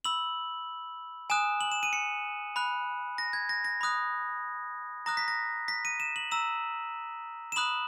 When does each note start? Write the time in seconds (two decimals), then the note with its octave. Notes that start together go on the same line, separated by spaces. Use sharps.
0.05 B5 E6 F#7
1.30 G#5 D#6 F#6 E7
1.61 F#7
1.72 E7
1.83 D#7
1.93 C#7
2.56 B5 F#6
3.18 A#6
3.33 G#6
3.49 A#6
3.65 A#6
3.81 B5 D#6 F#6
5.06 A#5 D#6 F#6 A#6
5.17 B6
5.28 A#6
5.68 B6
5.85 D#7
6.00 E7
6.16 F#7
6.31 A#5 E6 E7
7.52 E7
7.56 B5 D#6 F#6 F#7